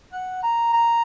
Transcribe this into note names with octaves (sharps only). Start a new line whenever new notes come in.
F#5
A#5
A#5